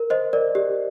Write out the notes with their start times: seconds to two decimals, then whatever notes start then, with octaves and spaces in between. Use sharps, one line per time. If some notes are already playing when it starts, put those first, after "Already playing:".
Already playing: A#4
0.10 C5 D#5
0.33 A#4 D5
0.55 G4